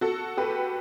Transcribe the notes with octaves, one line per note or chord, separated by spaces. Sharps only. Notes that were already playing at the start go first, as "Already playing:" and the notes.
F#4 A4
G4 B4